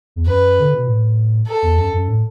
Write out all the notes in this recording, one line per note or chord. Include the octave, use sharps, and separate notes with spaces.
E2
F#2 B4
D3
B2
A2
A4
E2
F#2
F#2
A2